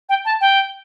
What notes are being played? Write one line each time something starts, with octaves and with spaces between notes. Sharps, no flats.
G5
A5
G5